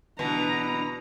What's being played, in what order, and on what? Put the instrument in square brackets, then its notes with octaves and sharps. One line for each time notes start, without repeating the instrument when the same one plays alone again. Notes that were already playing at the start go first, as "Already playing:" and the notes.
[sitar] B2 E3 [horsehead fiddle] D4 A#5